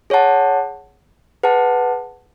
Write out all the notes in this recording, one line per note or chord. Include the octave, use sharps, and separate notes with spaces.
G#4 C#5 F#5 A5
G#4 B4 F#5 A5